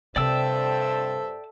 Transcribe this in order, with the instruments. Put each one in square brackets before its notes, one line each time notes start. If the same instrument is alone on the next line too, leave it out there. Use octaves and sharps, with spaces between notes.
[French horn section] G2 C5 [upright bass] C3 [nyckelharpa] A4 E5 [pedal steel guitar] D5 G5 E6